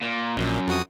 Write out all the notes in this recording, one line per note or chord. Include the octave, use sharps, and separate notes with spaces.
A#2
A#1 F#2 A#2
F2 F#4 D#6